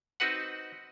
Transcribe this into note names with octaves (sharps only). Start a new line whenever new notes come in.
C4 D#4 F#4 B4 F#5